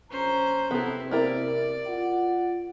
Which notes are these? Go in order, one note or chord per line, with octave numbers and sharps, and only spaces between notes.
A#1 C#4 C5 A#5
C3 B3 C4 E4 A4
A#3 E4 A#4 D5
F4 F#5